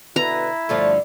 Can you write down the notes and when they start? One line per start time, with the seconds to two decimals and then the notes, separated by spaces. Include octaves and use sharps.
0.16 B2 D3 E4 B4 A#5
0.69 G2 D3 F3 A3 F4